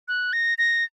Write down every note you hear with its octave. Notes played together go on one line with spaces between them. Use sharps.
F#6
A#6
A#6